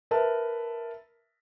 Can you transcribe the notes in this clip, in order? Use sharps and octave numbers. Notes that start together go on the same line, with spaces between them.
A#4 B4 E5 A5